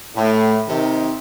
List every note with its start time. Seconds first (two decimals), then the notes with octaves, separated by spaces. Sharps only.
0.16 A2
0.69 C3 D#3